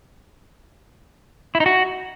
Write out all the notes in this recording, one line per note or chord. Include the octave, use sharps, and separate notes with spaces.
E4
D#4
F#4